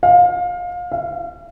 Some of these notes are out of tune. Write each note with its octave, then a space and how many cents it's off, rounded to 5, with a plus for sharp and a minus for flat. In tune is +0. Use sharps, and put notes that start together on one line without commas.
F5 +25
F5 -40